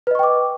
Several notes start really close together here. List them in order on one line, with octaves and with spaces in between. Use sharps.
B4 D#5 C#6 G5 D6